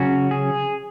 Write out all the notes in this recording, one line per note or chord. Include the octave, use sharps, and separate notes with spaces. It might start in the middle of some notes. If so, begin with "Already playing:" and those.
Already playing: C#3 F#3 C#4 F#4
G#4